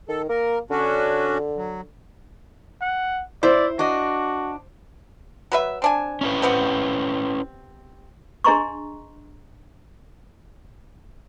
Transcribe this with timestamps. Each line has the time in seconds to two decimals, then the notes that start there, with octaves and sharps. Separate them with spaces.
0.09 D#3 A4
0.29 A#3 A#4
0.70 D3 C#4 D4 F#4
1.57 F#3
2.82 F#5
3.43 E4 C5 D5
3.79 D4 F#4 D#5
5.52 F#3 B4 E5
5.82 C4 D4 G#5
6.21 C#4 E4 B4
6.42 C3 B3 C4
8.44 D4 G#4 D#5 A#5 C6 C#6